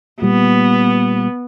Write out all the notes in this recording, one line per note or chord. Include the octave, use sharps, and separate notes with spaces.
A#2 G3 B3